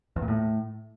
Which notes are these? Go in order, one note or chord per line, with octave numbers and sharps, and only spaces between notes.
E2
A#2
A2